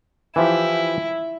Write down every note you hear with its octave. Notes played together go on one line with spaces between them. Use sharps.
E3 F3 E4 G4